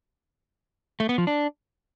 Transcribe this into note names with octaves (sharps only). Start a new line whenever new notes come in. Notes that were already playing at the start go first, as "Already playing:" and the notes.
A3
B3
F3
D4